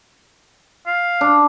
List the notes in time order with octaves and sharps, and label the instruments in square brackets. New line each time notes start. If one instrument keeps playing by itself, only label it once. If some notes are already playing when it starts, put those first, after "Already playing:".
[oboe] F5
[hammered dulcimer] D4